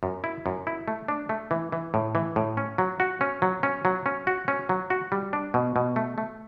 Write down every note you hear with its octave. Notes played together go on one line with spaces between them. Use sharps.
F#2
E4
F#2
E4
A3
D4
A3
E3
E3
A2
E3
A2
C#4
F#3
F#4
C#4
F#3
C#4
F#3
C#4
F#4
C#4
F#3
F#4
G3
D4
B2
B2
A3
A3